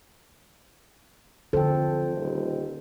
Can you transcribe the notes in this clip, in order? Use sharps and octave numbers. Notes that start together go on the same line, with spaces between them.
F2 D3 E3 A4 C5 G5
D#1